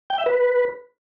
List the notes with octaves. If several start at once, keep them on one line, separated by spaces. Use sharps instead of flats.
G5
E5
B4